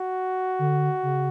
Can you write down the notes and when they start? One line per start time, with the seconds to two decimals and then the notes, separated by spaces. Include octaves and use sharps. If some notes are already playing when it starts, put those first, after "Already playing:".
Already playing: F#4
0.59 D3
1.03 C#3